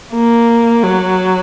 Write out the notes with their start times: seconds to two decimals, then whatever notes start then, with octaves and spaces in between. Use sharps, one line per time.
0.14 A#3
0.83 F#3